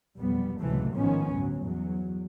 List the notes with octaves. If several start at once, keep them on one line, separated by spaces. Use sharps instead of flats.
F1 B1 G3 B3
C#2 A2 C3 E3 F#3 A3
A1 G#2 D#3 F3 B3 C#4
G1 D2 A2 F#3
E2 F#3